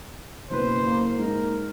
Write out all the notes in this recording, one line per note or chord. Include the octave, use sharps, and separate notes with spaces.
F#1 B2 B4 C5
A#3
G#2 A#4